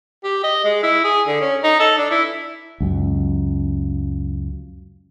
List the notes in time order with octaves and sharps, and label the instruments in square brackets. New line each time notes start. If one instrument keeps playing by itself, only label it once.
[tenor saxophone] G4
D#5
G#3
E4
G#4
D3
C#4
D#4
A4
D4
E4
[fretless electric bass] C#2 F#2